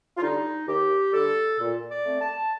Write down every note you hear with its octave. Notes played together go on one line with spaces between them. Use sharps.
F4
D3 G3 D#4
D#2 G4
D3 G3 A4
A#2
D5
A3 C4
A5